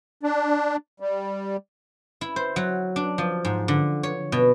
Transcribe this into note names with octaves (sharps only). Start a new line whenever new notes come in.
D4
G3
E4
C5
F#3
D4
F3
G#2
D3
C#5
B2